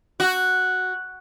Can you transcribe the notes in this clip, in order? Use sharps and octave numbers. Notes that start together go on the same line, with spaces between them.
F#4